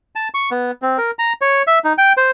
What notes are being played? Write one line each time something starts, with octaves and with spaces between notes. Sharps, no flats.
A5
C#6
B3
C4
A#4
A#5
C#5
E5
D#4
G5
C5